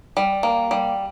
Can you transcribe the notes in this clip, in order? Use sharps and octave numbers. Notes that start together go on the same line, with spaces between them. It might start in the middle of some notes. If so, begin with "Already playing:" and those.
G3
A#3
G3